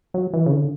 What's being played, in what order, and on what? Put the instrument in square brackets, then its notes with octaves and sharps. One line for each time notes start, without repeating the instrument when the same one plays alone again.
[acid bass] F#3
E3
C#3
D3